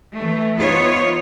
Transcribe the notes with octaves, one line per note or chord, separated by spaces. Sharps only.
E3 A3
E3 B3 D#4 F4 C5 C#5